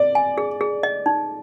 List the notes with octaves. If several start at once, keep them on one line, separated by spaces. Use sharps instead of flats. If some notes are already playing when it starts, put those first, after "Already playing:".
Already playing: D5
G#5
G#4
G#4
D#5
D#4